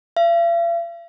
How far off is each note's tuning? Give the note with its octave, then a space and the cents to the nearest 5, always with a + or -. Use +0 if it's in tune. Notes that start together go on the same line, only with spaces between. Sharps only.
F5 -45